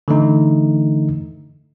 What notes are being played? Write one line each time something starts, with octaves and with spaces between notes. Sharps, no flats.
D3 E3 A3 D#4